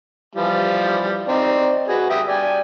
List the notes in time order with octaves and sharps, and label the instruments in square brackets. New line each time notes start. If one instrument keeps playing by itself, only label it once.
[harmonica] E3 F3 G3
C4 D#4 D5
F#4 G#4 B4
G4 E5 D#6
D5 G5 G#5